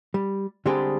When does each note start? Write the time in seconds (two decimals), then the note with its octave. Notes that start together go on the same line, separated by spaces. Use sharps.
0.14 G3
0.66 D3 G3 G#3 C4 G4 G#4